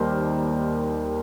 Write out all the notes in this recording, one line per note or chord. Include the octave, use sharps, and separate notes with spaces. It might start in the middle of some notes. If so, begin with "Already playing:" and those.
Already playing: D#2 G3 A#4 C5